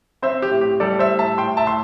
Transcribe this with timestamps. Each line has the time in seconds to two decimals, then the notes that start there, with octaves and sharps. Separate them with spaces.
0.22 C4 C5 E5
0.42 G4
0.51 A2
0.61 G4
0.80 G3 A4 D5
0.99 C5 E5
1.09 A2
1.19 E5 A5
1.38 A2 G5 C6
1.57 E5 A5
1.67 A2 C6